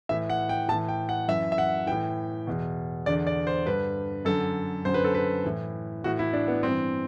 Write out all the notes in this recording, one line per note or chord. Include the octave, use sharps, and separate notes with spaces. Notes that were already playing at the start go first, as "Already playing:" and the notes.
A2 E3 E5
F#5
G5
A2 E3 A5
G5
F#5
F#2 E3 E5
E5
F#5
A2 E3 G5
E2 B2
E2 D3 D5
D5
C5
G2 D3 B4
F#2 D3 A4
F#2 D3 C5
B4
A4
B4
A2 E3
A2 E3 F#4
E4
D4
B3
G2 C4
E3